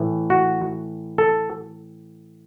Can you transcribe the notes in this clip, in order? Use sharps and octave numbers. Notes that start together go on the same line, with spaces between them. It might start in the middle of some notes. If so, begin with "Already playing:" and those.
Already playing: A2 E3
F#4
A4